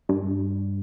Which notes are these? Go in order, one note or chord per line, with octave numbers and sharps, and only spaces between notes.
G2